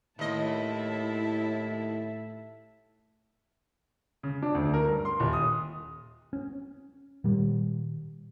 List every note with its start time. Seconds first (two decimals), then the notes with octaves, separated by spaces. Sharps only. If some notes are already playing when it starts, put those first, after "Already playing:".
0.19 D#2 A2 E4 D#5 E5 A5
4.23 C#3
4.42 D4
4.55 D2
4.74 A#4
4.87 G2
5.05 C6
5.20 D#1
5.33 D#6
6.33 C#4
7.24 A#2 D#3 G3